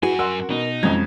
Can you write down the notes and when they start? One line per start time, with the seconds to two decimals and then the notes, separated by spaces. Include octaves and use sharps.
0.03 F#2 E4 F#4 G#4 B4 G#5
0.19 A#4 F#5 C6 E6
0.50 B2 D#4
0.83 F2 F#3 G#3 C#4 A#5 G#6